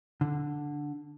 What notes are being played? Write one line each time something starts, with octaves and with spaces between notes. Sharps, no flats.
D3